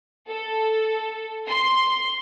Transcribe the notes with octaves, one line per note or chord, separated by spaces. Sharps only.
A4
C6